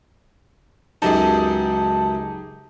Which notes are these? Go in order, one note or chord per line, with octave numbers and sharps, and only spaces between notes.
C#2 F#2 D#4 G4 G#4 A5